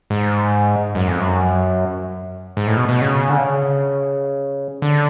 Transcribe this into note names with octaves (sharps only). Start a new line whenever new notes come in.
G#2
F#2
F2
F#2
G#2
A2
B2
B2
C#3
D3
C#3
D3